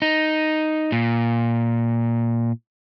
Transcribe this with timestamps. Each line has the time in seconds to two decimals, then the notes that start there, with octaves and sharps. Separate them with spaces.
0.02 D#4
0.92 A#2